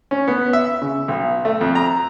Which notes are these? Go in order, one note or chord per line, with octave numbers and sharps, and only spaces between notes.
C#4
B3
E5
C#3
B1
A3
F2
A#5